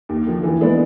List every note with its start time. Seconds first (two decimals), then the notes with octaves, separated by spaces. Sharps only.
0.09 D#2
0.26 D3 F3 A#3
0.43 E3
0.61 G#3 B3 D4